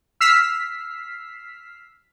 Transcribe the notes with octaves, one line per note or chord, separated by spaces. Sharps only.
E6 F6 B6 C7